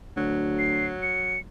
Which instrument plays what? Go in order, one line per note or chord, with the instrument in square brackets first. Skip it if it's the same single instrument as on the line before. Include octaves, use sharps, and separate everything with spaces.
[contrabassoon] D2 [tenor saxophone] F#3
[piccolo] C7
C#7